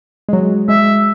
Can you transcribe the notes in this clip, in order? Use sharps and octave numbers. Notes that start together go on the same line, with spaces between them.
F#3 G#3
G#3 E5